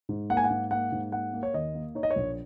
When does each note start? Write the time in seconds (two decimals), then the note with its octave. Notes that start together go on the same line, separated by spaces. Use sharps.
0.09 G#2
0.30 A#3 F#5
0.37 G#5
0.44 F#5
0.50 G#2
0.71 A#3 F#5
0.92 G#2
1.12 A#3 F#5
1.33 A#3
1.43 C#5
1.54 D#2 D#5
1.75 A#3
1.95 D#4 C#5
2.03 D#5
2.11 C#5
2.16 A#1